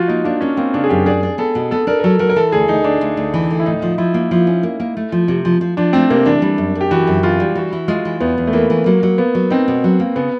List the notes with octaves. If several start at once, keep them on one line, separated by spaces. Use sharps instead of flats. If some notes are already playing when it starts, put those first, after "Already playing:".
Already playing: F3 F4 F#4
A#3 D#4
A#3 D4
A#3 C#4
A#3 C4
C#3 D4
G#4
F#2 G4
D4 G#4
D4
B3 A4
B2
B3 A4
D4 A#4
A#4
F#3 A4
F#3 A#4
A#4
E3 A4
D2 G#4
D2 D#4
D2 D4
D2
D2
E3
D2
E4
A2 D#4
F3
F3 E4
A#3
F3 E4
C#4
A#3
A#3
A3
F3
C3
F3
F3
F3 D4
A3 C4
C3 A#3
E3 D4
G3
F#2
F#2
G4
E3 F#4
F#2
E3 F4
G3
E3 F#4
E3
G#3 F4
E3
E2 B3
E2
A3
E3 A#3
E3
F#3 A#3
F#3
A#3 B3
F#3
C4 D#4
B2
F#3
A#3
C#3 B3